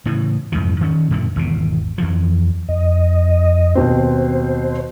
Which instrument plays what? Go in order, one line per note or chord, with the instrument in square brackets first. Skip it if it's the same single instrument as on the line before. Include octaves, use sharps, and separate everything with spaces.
[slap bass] A2 C#3 E3
F2 G#2 C3 E3
D#3 C#4
F#2 A#2 D3 D#3
G#1 E2 B2
F2 E3 F3
[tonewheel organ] F2 D#5
[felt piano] D#2 B2 C4 [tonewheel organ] C5